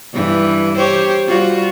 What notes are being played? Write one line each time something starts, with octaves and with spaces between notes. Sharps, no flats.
G2 E3
G4 C5 C#5
G3 F4 F#4